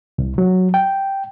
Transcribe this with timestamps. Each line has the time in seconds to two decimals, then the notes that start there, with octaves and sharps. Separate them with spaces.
0.18 C2
0.38 F#3
0.74 G5